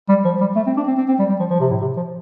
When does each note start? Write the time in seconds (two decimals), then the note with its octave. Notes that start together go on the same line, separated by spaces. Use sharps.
0.09 G3
0.25 F3
0.41 G3
0.56 A3
0.67 C4
0.77 D4
0.88 C4
0.98 C4
1.08 C4
1.19 G3
1.29 G3
1.39 F3
1.50 F3
1.60 C3
1.71 A2
1.81 C3
1.97 F3